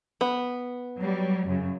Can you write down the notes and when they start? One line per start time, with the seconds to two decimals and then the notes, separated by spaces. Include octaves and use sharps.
0.21 B3
0.97 F#3 G3
1.47 F#2 C#3